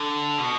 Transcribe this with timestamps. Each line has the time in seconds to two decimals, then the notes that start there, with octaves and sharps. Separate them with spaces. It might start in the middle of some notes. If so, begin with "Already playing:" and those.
Already playing: D3
0.38 B2